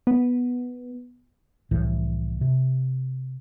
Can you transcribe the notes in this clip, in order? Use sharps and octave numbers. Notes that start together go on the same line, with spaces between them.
B3
C2 A2 E3 F3
C3